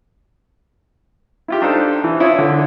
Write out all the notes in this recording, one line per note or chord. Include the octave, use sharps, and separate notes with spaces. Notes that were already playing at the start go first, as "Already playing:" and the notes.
E4 F4 G4
D4 D#4 A4 C5 F5
E3
E4 F4 C#5 D#6
D3